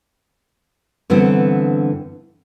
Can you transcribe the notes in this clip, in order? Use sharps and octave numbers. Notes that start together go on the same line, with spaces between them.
G2 D3 E3 B3 C4